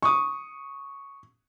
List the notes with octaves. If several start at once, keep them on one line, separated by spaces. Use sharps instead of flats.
C#6 D#6